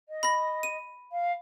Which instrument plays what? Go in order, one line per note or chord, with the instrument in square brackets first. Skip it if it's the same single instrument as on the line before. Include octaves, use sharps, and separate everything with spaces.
[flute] D#5
[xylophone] B5 A#6
D#7
[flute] F5